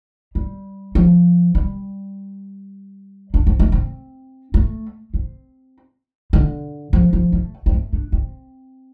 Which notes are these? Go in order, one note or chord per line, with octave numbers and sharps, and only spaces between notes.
G3
F3
G3
D4
C4
A3
C4
A3
C4
D3
F3
F3
A3
C4
A3
D4
C4